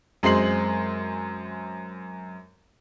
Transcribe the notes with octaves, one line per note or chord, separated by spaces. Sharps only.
F#2 G#3 C4 C6 C7 F#7